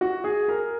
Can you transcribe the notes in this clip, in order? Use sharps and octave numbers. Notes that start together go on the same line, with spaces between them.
F#4
G#4
A#4